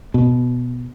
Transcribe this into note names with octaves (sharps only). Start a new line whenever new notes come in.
B2